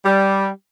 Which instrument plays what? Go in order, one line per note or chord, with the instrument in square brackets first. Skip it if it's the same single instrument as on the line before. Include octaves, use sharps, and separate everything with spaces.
[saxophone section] G3